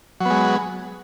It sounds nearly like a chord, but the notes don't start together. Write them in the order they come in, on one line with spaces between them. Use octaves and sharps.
F#3 B3 G#3